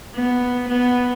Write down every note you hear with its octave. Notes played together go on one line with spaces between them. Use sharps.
B3
B3